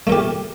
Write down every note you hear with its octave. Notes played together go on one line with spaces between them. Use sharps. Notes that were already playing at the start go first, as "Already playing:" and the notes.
A3 G4 A#4